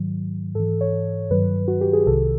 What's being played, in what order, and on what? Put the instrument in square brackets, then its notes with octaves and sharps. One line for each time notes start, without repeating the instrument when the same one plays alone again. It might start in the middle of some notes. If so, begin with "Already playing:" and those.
Already playing: [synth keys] G#2 D#3 F#3
G#2 E3 A4
C#5
G2 D#3 F#3 B4
F#4
G4
G#4
C2 C3 D#3 A4